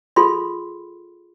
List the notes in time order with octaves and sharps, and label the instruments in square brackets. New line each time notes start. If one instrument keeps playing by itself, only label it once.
[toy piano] F4 G#4 A4 B5 C6